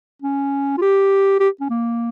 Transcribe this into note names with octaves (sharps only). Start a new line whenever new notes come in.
C#4
F4
G4
G4
C#4
A#3